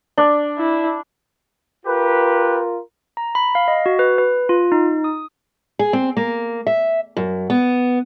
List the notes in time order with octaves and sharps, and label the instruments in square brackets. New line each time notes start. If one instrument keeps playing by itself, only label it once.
[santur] D4
[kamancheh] E4
[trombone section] F4 A#4 [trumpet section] G4 B4
[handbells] A#5
B5
F5
D#5
F#4
B4
B4
F4
D#4
D#6
[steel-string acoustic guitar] G#4
C4
A#3
E5
F#2
B3